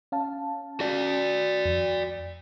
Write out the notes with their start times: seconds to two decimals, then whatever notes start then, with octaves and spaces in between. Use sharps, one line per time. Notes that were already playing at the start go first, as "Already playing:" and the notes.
0.12 C#4 F5 A5
0.80 F#4 D5
1.65 F2